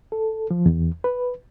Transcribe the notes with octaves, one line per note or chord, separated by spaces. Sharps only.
A4
F3
E2
B4